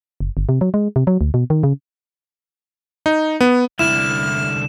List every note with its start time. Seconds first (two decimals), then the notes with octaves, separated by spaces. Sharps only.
0.20 F#1
0.37 G1
0.49 C3
0.61 F#3
0.74 G#3
0.96 C3
1.07 F#3
1.21 D2
1.34 B2
1.50 D#3
1.63 C#3
3.06 D#4
3.41 B3
3.79 C2 D3 E4 F6 E7